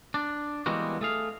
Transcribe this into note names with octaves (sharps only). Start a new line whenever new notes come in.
D4
E3 G3 G#3 A#3 B3 F#4
A3 G#4 F5